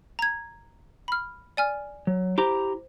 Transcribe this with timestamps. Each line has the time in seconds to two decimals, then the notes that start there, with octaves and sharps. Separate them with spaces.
0.19 A#5 G#6
1.08 B5 F6
1.57 D5 G#5 F6
2.07 F#3
2.38 E4 G4 C5 A#5